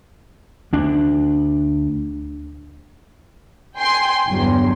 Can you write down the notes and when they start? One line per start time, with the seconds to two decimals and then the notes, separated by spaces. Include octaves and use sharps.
0.73 D2 D4
3.76 G5 G#5 C6 C7
4.28 G1 E2 G2 F#3